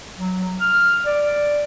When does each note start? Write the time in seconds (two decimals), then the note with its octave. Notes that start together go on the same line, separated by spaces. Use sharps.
0.18 F#3
0.60 F6
1.06 D5